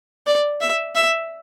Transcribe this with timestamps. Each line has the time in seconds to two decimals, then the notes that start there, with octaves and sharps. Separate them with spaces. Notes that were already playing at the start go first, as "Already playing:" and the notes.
0.27 D5
0.61 E5
0.95 E5